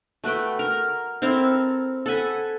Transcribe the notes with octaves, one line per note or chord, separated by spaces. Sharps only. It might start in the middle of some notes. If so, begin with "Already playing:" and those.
A3 F#4 B4 G5
A#4
C4 E4 A4 A#4
A4 F#5 G#5 B5